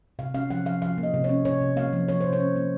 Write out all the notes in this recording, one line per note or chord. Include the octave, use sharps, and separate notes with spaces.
C3 F5
C#4 F5
F3 F#5
F3 F5
F3 F5
A#3
D#5
C3
C#5
C#4
C3 C#5
C3
A#3 F5
F3
F3 C#5
C3 C5
C#5
C#4
A#3